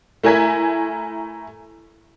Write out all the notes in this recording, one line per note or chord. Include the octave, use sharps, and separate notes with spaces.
A3 E4 A#4 G#5 G#6 B6